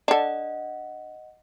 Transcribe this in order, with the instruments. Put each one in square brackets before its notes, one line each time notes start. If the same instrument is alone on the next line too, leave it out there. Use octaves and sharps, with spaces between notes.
[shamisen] D4 A4 [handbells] D#5 F#5